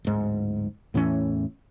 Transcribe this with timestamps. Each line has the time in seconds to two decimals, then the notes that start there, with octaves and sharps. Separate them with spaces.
0.05 D1 G#2
0.94 E2 A2 E3 C#4